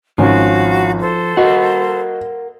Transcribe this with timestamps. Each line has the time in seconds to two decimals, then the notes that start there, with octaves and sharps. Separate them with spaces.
0.18 G#1 F3 C#4 F#4 F5
0.99 A4 C5
1.37 F#4 A#4 D#5 F5 F#5